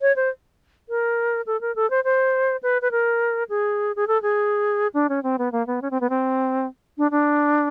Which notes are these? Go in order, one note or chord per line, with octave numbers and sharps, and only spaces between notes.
C#5
C5
A#4
A4
A#4
A4
C5
C5
B4
B4
A#4
G#4
G#4
A4
G#4
D4
C#4
C4
B3
A#3
B3
C#4
C4
B3
C4
D4
D4